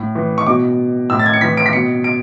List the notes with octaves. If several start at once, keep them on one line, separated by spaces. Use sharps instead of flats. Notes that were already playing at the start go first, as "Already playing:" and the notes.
Already playing: A2
E3
C#6
B2 D6
A2 E6
A6
G#6
C#7
E3 B6
D7
B6
B2 C#7
D7